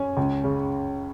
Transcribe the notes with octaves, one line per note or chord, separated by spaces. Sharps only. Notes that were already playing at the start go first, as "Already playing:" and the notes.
Already playing: C#4 G#5
C#2
C#3